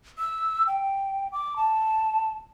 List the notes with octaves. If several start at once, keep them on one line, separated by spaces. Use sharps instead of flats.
E6
G5
D6
A5